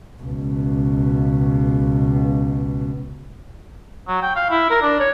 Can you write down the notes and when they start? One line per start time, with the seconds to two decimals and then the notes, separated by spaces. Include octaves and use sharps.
0.22 C#2 B2
4.08 F#3
4.22 G5
4.36 F5
4.50 E4
4.70 A#4
4.82 D4
5.00 C#5